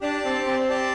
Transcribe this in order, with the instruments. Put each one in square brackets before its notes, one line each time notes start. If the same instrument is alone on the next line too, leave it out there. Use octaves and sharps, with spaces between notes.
[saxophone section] D4 [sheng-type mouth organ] G4 D5 A5
[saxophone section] C4
C4
[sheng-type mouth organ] G4 D5 A5